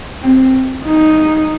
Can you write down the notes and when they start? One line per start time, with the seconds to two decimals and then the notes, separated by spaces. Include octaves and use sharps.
0.22 C4
0.85 D#4